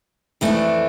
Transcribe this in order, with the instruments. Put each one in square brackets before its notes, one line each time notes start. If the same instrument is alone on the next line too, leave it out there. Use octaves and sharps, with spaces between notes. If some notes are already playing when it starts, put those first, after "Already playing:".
[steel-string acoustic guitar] F2 E3 A3 D4